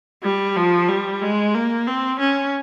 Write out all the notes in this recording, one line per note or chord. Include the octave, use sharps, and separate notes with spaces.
G3
F3
G3
G#3
A#3
C4
C#4